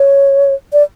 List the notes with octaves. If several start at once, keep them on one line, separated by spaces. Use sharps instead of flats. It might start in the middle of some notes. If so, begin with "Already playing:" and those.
Already playing: C#5
D5